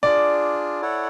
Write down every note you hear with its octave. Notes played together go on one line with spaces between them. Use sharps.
D4 F4 G#4 D5
E4 A4 C#5 F#5